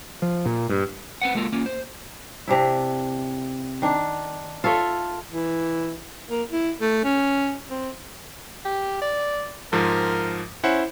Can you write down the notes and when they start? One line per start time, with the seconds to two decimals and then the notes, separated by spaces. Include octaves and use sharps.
0.22 F3
0.46 A#2
0.69 G2
1.22 C4 B4 F#5
1.35 G#3 A#3 F4 A4 A#4
1.52 A#3 C#4 F4
1.66 C5
2.48 C3 D4 E4
3.82 D#3 D4
4.64 F4 A4 C#5 E5
5.31 E3
6.30 A#3
6.51 E4
6.81 A3
7.04 C#4
7.70 C4
8.65 G4
9.01 D5
9.73 G#2 F3 A#4
10.64 C#4 E4 C5 F#5